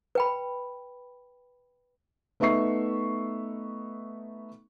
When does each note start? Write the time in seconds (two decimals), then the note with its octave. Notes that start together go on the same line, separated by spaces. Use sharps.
0.15 B4 G5 B5
2.40 A3 B3 D#4 E5 C#6 C7